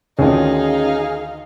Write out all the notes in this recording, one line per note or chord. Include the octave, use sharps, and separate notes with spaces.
D2 D#3 C#4 D#4 F4 G#4 F5